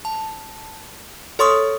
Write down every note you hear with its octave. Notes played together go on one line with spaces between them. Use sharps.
A5
A4 C#5 C6 C#6 D#6